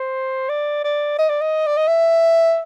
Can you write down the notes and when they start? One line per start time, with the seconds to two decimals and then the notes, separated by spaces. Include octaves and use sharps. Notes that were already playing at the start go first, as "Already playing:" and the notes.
Already playing: C5
0.49 D5
0.84 D5
1.19 D#5
1.29 D5
1.41 D#5
1.67 D5
1.77 D#5
1.88 E5